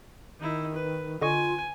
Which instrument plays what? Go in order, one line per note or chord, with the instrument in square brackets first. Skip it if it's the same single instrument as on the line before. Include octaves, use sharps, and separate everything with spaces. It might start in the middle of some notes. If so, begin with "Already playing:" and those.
[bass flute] D#3 [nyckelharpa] D#4 E4
[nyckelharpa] B4
[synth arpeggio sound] D3 D#5 C#6 [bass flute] F4 [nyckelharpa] G#5